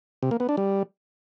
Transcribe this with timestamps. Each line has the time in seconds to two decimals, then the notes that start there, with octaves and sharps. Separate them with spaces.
0.23 C3
0.31 A#3
0.40 B3
0.49 D4
0.57 G3